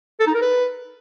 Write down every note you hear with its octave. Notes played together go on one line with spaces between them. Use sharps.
A4
D#4
A#4
B4